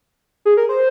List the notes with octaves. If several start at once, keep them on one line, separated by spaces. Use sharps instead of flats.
G#4
A#4
C5